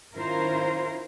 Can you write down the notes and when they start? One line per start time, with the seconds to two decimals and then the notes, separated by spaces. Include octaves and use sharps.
0.14 D#3 C#4 E4 F4 A#4 C5